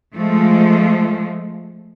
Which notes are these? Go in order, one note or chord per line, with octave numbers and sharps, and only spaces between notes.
F3 G#3 A3